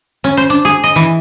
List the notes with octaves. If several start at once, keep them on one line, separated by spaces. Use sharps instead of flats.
C#4
C5
D4
G#4
D#5
E3